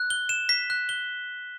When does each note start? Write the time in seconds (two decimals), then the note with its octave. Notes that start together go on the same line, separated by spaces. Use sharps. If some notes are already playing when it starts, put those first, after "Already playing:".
Already playing: F#6
0.10 G7
0.29 E7
0.49 B6
0.70 F#6
0.89 G7